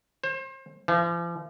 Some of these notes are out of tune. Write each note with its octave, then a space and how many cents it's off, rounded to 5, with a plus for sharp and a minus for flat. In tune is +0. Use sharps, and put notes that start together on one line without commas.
C5 +35
F3 -45